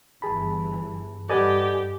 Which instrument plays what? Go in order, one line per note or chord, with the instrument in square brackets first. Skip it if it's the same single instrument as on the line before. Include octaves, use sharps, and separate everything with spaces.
[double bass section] G1 E3 [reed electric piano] G#4 A5 B5
[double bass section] G2 [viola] G4 [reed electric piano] A4 B4 F#5 [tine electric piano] D5 D#5 G#5